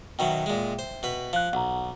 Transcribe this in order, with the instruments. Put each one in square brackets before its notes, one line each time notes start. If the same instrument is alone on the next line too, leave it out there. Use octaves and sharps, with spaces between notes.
[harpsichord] B2 D#3 F#3 [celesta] E5 G5
[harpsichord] A#2 G#3
C5
B2 B4
[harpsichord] F3 [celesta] F5 F#6
[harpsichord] B1 [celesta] F#5 A#5